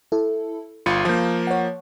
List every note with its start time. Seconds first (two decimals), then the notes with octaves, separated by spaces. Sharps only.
0.12 E4 A4
0.86 G1 F4 B5 C#7
1.05 F3 A#3 F5 G6
1.47 C#5 F#5